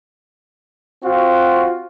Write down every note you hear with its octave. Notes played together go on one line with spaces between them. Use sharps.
C4 F4 F#4